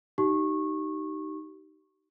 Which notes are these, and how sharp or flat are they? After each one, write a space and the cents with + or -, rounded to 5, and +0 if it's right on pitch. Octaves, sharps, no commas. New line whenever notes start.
D#4 +0 G4 -30 C#6 -20